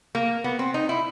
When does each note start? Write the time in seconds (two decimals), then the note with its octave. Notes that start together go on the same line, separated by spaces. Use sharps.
0.15 A#3
0.44 B3
0.59 C4
0.74 D#4
0.89 E4